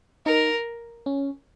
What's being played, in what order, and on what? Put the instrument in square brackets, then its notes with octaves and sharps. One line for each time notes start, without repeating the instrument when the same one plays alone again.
[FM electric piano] D#4 [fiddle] A#4
[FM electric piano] C#4